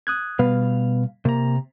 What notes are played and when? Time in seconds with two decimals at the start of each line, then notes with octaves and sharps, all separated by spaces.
0.07 D#6 F#6 G#6
0.39 B2 G3 B3 B4 F5
1.25 C3 A#3 A#5